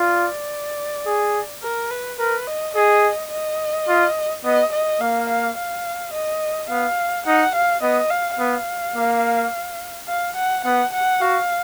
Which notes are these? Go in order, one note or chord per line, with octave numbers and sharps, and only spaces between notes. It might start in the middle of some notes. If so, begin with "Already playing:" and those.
Already playing: F4 D5
G#4
A#4
B4
A#4 B4
D#5
G#4 D#5
D#5
F4
B3 D#5
D#5
A#3 F5
F5
F5
D#5
B3 F5
D#4 F#5
F5
B3 D#5
F5
B3 F5
A#3
F5
F#5
B3 F#5
F#5
F#4 F5